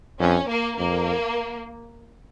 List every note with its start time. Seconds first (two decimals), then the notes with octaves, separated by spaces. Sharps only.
0.20 F2 C#4
0.49 A#3
0.78 F2 A#3